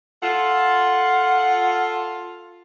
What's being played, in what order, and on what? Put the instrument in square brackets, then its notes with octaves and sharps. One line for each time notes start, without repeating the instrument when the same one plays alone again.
[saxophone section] F4 A4 [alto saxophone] F#5